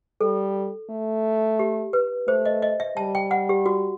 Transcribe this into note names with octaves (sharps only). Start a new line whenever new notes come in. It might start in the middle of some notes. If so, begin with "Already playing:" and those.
G3 A4
A3
G4
B4
A3 C5
D#5
D#5
E5
G3 A5
G5
F#5
G4
F#4